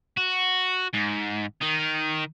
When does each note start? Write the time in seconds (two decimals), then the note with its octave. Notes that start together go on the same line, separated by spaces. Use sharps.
0.17 F#4
0.93 G#2
1.62 D#3 D#4